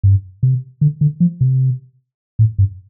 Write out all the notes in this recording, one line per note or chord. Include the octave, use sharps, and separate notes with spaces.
G2
C3
D3
D3
F3
C3
A2
G2